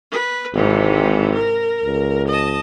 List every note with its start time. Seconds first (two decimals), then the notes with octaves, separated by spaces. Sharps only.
0.11 B4
0.54 G#1 G#2 C3 E3
1.35 A#4
1.84 C#2
2.28 D#5 A5